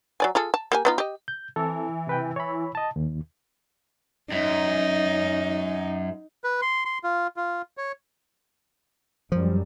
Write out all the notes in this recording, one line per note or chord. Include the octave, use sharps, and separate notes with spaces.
F#3 D5 G#5
F4 G#4 A4
A5
A#3 G4 G#5
B3 D#4 F4
G4 D#5
G6
E3 C4 A4
C3 B4 G5
C#5 B5
D#5 A5
D#2
F#2 D#4
B4
C6
C6
F4
F4
C#5
F#2 F3 G3